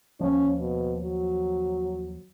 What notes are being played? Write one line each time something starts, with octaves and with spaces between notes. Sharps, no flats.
D#2 F3 C#4
B2
F#3